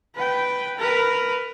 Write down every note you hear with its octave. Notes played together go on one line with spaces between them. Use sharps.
B4 G5
A#4 B4